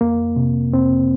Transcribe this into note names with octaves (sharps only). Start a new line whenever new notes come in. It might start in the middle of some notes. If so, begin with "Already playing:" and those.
F2 A#3
C3
F2 C4